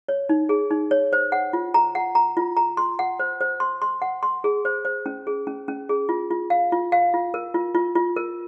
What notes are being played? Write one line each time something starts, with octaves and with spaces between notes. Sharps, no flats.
C#5
D#4
G#4
D#4
C#5
C5
F#5
F4
A#5
F#5
A#5
F4
A#5
C6
F#5
C5
C5
C6
C6
F#5
C6
G#4
C5
C5
C#4
G#4
C#4
C#4
G#4
F4
F4
F5
F4
F5
F4
A#4
F4
F4
F4
A#4